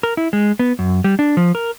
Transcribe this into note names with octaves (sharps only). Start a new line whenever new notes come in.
A#4
E4
G#3
B3
F#2
G3
D4
F3
A#4